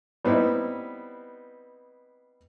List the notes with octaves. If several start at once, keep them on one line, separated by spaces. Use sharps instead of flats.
G3 B3 C4 D#4 E4